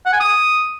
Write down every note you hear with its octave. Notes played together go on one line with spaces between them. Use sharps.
F#5
G#5
D#6